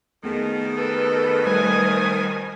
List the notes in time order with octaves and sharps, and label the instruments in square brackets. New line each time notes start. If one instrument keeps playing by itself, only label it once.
[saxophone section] F2 B2 D#3 [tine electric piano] A3 B3 G#4
[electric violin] A4 [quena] B4
[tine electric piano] G3 A3 C5 [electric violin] G#5 D#6